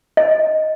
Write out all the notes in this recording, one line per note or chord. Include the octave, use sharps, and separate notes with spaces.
D#5